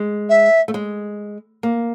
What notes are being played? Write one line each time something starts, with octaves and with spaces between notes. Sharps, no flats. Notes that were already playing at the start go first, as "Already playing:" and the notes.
Already playing: G#3
E5
A3
G#3
A#3